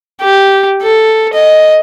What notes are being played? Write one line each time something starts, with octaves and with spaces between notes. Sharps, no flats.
G4
A4
D#5